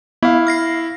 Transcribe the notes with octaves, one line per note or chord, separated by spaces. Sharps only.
B3 E4 F5
F6 A#6 C7